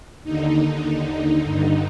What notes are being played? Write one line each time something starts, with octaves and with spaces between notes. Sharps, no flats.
D#2 D3 D#4
D#2 D3
G2 D3 D#4